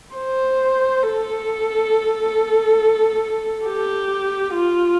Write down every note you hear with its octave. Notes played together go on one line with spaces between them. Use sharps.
C5
A4
G4
F4